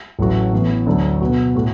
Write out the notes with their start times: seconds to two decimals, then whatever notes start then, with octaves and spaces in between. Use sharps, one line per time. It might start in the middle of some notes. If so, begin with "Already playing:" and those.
0.19 A1 A2 F#3 A3 F#4
0.53 A2 E3 B3
0.86 D2 D3 F#3 D4 A4
1.21 B2 B3 F#4
1.55 A2 A3 F#4 A4